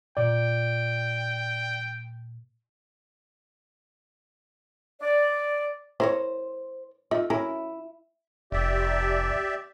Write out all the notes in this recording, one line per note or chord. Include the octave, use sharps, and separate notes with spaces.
A#2 D5 G5 D7
D5
E4 A#4 C5 C#5
A3 D#4 F4 E5
F#3 C#4 E4 A#4
F1 G4 D5 E5